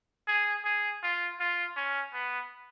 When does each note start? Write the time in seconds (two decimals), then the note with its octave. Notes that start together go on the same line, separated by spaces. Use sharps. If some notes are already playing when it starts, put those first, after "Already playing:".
0.27 G#4
0.65 G#4
1.03 F4
1.40 F4
1.76 C#4
2.13 B3